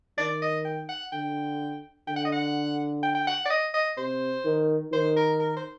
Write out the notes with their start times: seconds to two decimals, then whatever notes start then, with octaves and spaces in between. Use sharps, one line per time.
0.18 D#3 D5
0.42 D#5
0.65 G5
0.89 F#5
1.12 D3 G5
2.07 D3 G5
2.16 F#5
2.25 D#5
2.33 F#5
3.03 G5
3.15 G5
3.27 F#5
3.45 D5
3.51 D#5
3.74 D#5
3.98 C3 C5
4.45 D#3
4.92 D#3 C5
5.16 A#4
5.40 A#4
5.57 C5